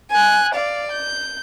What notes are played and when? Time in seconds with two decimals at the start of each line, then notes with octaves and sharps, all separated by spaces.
0.11 G#5 F#6
0.54 D5 F5
0.91 G6